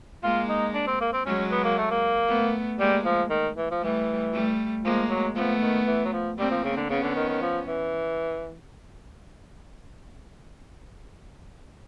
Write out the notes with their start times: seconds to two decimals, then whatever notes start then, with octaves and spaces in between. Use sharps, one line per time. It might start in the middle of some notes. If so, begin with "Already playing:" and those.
0.23 G#3 A#3 F4
0.49 D#4
0.74 D4
0.87 C4
1.01 A#3
1.13 C4
1.26 F#3 G#3 C#4
1.51 B3
1.64 A#3
1.78 A3
1.91 A#3
2.28 A3 B3
2.79 G3 G#3 A#3
3.05 F3
3.30 D#3
3.56 E3
3.71 F3
3.82 E3 G3 A3
4.33 G3 A3
4.84 F3 G#3 A#3
5.10 F#3
5.35 F3 A3 B3
5.61 D#3
5.87 E3
6.05 F#3
6.13 F3
6.38 G3 A#3 C4
6.51 F3
6.64 C#3
6.77 D3
6.89 C#3 B3 C#4
7.03 D3
7.15 D#3
7.28 D#3
7.41 F3
7.67 E3